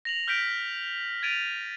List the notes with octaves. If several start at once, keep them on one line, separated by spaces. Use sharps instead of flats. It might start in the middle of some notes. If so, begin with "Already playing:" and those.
A#6 F7 F#7
F6 G6 B6 D7 G7
G#6 A6 D7 D#7 F7